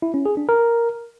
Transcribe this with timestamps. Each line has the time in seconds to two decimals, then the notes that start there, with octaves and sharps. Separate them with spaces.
0.02 E4
0.14 C#4
0.26 G#4
0.37 D4
0.49 A#4